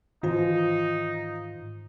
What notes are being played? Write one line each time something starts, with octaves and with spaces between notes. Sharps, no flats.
G#2 D#3 E3 D#4 F4 C5